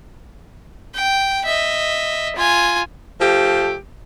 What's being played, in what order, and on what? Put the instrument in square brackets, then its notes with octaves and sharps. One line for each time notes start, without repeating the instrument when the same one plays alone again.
[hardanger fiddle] G5
D#5 E5
F4 G#5
[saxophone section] F3 A3 G4